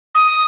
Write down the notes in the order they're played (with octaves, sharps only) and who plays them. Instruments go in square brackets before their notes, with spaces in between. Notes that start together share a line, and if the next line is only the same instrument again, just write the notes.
[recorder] D#6